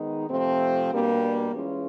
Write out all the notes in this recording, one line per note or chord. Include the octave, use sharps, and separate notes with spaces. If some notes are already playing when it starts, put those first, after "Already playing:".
Already playing: D#3 G#3 B3 D#4
C3 F3 A3 C4
B2 G3 A#3 D4
E3 G#3 C#4 F4